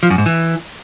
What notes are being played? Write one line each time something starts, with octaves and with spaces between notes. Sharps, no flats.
F3
F#2
G#2
E3